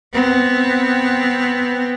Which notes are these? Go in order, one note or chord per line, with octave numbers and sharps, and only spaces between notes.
B3 C4